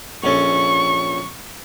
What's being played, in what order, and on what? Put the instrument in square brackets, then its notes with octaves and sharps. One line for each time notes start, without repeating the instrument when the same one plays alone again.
[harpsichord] A#1 C#4 A4 [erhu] C#6